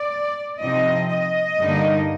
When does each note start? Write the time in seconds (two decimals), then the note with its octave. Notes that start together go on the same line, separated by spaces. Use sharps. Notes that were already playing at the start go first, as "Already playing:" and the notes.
Already playing: D5
0.61 C3 F3 C4 D#4 D#5
1.10 D#5
1.59 G2 D3 G3 A#3 D#4